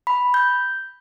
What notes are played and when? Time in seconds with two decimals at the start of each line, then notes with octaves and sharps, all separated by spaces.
0.07 B5
0.34 G6